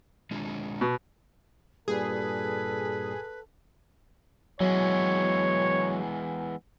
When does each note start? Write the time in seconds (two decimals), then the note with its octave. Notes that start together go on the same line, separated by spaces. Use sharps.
0.31 G#3 D4 F4
0.81 B2
1.88 G2 A#2 G3 G#4 A4 B4
4.61 E3 F#3 G#3 B3 C#5